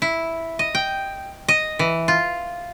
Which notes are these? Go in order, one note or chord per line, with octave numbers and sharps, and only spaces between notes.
E4
D#5
G5
D#5
E3
F4